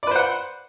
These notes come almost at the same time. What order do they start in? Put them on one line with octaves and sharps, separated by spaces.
D5 B4 C5 F#5